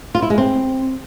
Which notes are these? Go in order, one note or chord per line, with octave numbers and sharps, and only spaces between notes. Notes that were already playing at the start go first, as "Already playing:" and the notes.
F4
E4
G#3
C4